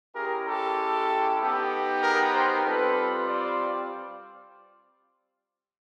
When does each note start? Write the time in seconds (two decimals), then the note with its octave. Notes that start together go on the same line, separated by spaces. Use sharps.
0.15 G#3 C#4 E4 G4 G#4 A#4
0.46 G4 A4
1.40 B3 D#4 G4
2.02 G#4 A#4
2.33 A#4 C5
2.64 G3 C4 F4 A4 B4
3.27 C5 D5